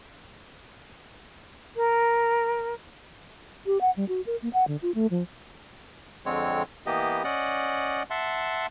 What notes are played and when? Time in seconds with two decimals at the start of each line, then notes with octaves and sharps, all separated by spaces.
1.76 A#4
3.66 G4
3.81 F#5
3.97 G3
4.09 F#4
4.27 A#4
4.42 A#3
4.53 F#5
4.68 D3
4.82 F4
4.95 A3
5.11 F3
6.26 F2 D3 G#3 C4 C#5
6.86 E3 A#3 B3 G4 D#5
7.24 C#4 D5 D#5 F#5
8.10 E5 F#5 A5 C6